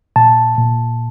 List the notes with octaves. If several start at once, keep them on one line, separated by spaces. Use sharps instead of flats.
A#2 A5
A#2